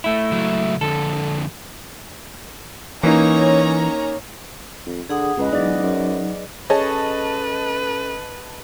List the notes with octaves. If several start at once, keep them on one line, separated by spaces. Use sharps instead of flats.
A3 E4
C#2 F#3
F2 D3 A4
E3 A#3 C#4 D#4 C#5 A#5
F2
D3 G#4 F#5 D#6
C#2 G#4 B4 D#5
E1 F#3 D#4 D5 D#5
F#2
C#4 G#4 A4 B4 C#5 D#5 A5